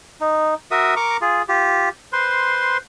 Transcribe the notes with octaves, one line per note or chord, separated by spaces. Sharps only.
D#4
F#4 A#4 E5 D#6
A#4 A#5 C#6 D6
F4 G#4
F4 G4
B4 C5 C6